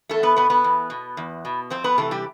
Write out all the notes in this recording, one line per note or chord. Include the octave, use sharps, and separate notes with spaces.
E2 A3 A4
B3 B4
B2 B3 B4
B3 B4
E2
B2
E2
B2
F2 C4 C5
B3 B4
C3 E3 A3 A4
G3 G4